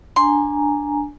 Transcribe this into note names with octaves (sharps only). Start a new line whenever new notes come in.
D4 G#5 A#5 C6